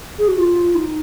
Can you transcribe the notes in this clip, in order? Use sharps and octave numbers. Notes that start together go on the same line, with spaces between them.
G#4
F#4
F4
D#4